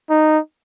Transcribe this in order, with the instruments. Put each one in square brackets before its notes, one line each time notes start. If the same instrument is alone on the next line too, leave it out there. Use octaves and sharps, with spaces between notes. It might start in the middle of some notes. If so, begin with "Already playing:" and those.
[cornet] D#4